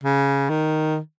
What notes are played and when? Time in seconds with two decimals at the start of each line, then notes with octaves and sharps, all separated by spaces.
0.04 C#3
0.49 D#3